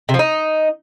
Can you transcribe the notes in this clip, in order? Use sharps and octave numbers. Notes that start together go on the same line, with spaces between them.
C3
F3
D#4